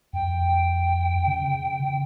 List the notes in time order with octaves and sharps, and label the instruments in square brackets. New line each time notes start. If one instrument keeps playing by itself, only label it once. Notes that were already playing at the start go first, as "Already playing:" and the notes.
[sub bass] F2 [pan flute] G5
[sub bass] C#3